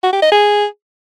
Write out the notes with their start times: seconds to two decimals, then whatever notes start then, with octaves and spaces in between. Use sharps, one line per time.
0.03 F#4
0.13 G4
0.22 D#5
0.31 G#4